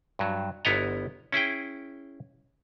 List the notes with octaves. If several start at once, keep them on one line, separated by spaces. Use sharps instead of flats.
G2 F#3
G1 B3 E4 C#5 D#5 A#5
C#4 E4 G#4 G5